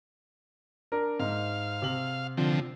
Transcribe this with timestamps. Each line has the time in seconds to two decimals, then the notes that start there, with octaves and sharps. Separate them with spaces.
0.92 D4 A#4
1.20 G#2 F5
1.82 C3 F#7
2.37 D3 F3 C4